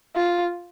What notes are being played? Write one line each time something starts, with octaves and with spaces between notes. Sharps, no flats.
F4